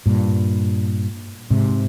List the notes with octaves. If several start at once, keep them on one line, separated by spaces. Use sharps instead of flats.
G2 A#2
G#2 C3